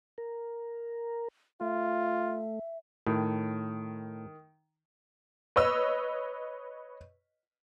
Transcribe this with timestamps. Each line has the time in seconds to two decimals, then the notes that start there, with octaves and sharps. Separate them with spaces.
0.18 A#4
1.61 A3 F4 E5
3.07 A2 D#3
5.56 B4 C#5 D#5 E6